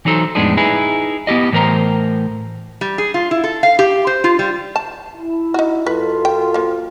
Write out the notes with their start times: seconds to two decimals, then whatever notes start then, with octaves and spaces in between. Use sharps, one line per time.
0.05 E3 F#3 D#4 A4 C5
0.35 F2 A2 G#3 B3 D4 D#4
0.57 D#4 E4 G#4 B4
1.27 B3 E4 G4 D#5
1.52 A2 E3 A#4 C5 A#5
2.81 G3
2.98 G#4
3.14 F4
3.31 E4
3.44 A4
3.63 F5
3.79 G4
4.07 C5
4.24 F4
4.39 G3
4.76 A5
5.16 E4
5.54 D#4 F#4
5.86 F#2 F4 A4 B4
6.25 G5
6.54 F3 A#3